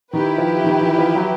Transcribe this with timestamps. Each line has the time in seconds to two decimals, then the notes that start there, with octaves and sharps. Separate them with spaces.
0.13 D#3 E4 G4 B4
0.38 F3
0.64 D#3
0.81 E3
0.99 F3
1.15 F#3